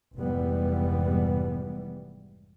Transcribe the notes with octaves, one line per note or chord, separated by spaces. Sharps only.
F1 G#2 E3 G3 B3